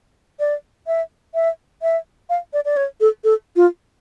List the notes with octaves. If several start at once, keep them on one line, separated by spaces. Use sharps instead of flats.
D5
E5
E5
E5
F5
D5
D5
C#5
A4
A4
F4